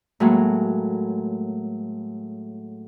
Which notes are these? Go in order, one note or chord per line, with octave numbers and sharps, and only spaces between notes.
A2 F#3 G#3 A#3